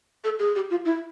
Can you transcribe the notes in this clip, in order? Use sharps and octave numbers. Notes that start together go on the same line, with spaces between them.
A4
G#4
G4
F4
E4